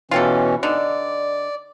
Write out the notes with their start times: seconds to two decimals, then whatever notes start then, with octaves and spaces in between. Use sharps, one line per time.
0.11 B2 E3 C#4 F4 G4 A4
0.63 D3 D#4 D5